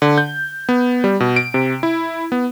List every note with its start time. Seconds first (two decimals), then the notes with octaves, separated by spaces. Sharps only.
0.02 D3
0.18 G6
0.69 B3
1.04 G3
1.20 B2
1.36 D7
1.54 C3
1.83 E4
2.32 B3